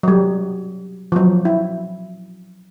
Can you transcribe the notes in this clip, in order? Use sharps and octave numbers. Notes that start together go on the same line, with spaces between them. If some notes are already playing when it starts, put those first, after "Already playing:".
F#3 G3
F3 F#3
E4